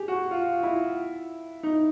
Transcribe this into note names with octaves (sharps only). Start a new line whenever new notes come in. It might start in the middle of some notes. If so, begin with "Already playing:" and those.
Already playing: G4 G#4
F#4
F4
E4
D#4